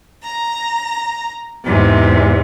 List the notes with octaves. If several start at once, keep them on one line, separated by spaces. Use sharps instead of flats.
A#5
E2 G#2 C3